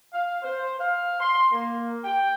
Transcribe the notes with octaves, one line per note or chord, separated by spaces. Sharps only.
F5
C5
F5
C6
A#3
G5